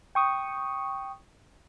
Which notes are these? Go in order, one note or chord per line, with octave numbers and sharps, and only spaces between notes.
G5 C#6 D#6